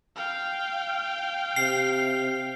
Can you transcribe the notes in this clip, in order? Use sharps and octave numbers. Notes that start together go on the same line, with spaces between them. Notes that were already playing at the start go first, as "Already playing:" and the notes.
F5 G5
C3 C7